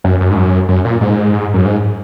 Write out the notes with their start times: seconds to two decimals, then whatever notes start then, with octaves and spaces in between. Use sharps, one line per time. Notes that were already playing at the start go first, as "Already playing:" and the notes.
0.04 F#2
0.20 F#2
0.31 G#2
0.36 F#2
0.69 F#2
0.85 A#2
1.01 G#2
1.54 F#2
1.65 G#2